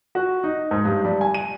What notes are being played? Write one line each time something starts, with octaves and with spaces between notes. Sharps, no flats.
F#4
D#4
G#2
G2
G3
G#5
D#7